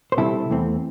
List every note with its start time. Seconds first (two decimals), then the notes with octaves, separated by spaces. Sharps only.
0.12 C5
0.17 C3 G3 C4 E4 A4
0.50 E2 E3 A3 C4